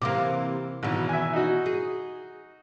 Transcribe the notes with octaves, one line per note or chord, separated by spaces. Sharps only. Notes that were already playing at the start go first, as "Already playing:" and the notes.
C3 E3 A#3 F5 D6
G#1 B2 E3
E5 G#5
D#4 F#4
G#4